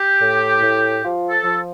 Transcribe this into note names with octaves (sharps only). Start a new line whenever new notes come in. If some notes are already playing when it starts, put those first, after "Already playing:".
Already playing: G4
A2
A2
F3 F4
A4
F3